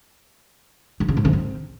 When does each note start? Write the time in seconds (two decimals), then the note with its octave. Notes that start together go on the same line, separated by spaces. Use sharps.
1.00 G2
1.08 C#3
1.17 G#2
1.25 C#3
1.33 C4